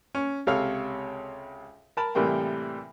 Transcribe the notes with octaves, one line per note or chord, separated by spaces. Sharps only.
C#4
C#2 C3 A4 C#5 F5 F6
A#4 A5 B5
A2 C3 E3 G3 A#3 G5